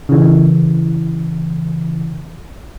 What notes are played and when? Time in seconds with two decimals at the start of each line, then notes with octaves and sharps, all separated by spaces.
0.09 C#3 E3